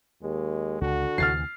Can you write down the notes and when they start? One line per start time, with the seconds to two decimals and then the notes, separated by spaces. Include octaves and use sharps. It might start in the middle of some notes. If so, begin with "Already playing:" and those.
0.23 D#2 G#3
0.81 C#2 D3 F#4
1.18 D2 C3 E3 F6 A6 C7